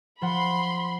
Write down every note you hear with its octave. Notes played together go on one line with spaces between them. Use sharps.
F3 F#5 B5 C6